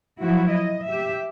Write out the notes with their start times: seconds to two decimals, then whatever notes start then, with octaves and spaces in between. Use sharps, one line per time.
0.21 F3 F#3 E4 F#4
0.53 D#5
0.87 G4 E5